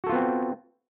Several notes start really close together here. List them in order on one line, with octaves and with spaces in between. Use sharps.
F#4 A4 F4 B3 C4